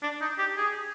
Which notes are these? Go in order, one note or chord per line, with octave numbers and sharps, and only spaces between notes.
D4
D#4
G4
G#4